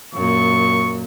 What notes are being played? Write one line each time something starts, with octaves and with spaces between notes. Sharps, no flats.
F#2 A#2 C#6